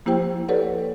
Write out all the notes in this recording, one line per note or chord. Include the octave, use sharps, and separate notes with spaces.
F3 A#3 E4 G4 C5 G5
G4 A4 B4 C#5 D5 F#5